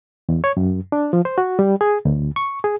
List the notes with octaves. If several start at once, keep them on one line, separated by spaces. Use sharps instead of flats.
E2
C#5
F#2
D4
F3
C5
F#4
G3
G#4
D2
C#6
G#4